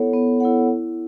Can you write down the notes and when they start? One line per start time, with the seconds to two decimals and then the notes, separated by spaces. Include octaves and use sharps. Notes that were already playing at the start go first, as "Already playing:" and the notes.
Already playing: B3 E4 A4 C#5 F#5
0.13 B3
0.40 E4 A4 C#5 F#5
0.68 E4